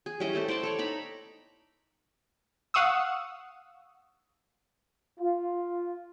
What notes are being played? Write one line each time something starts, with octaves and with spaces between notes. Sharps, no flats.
G#4
G3 C#4 E4 D#5
A3 E4 A4 C5
C5 D5 G5 A5
A4 C#5 D5
D#4 A#5 B5
F5 F#5 C#6 D#6 E6
F4